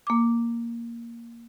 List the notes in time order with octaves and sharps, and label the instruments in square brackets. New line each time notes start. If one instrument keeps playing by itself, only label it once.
[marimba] A#3 D6